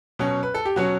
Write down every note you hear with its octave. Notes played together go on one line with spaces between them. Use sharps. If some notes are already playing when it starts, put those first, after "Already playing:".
B2 F#3 C#4
B4
A4
G4
B2 F#3 C#4 F#4